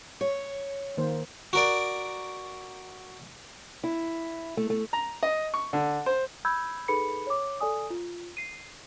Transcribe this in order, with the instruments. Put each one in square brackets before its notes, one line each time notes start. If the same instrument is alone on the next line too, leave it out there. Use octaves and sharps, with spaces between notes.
[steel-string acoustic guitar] C#5
[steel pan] D#3 A#3 C5
[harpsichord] F#4 A#4 D5
[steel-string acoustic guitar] E4
A3
A3
[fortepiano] A#5
D#5
C#6
D3
C5
[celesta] B5 E6 G6 G#6
D#4 G#4 A4 B4 B5 C#7
C#5 D6
A4 D5 G#5 D#6
F4
C7 D#7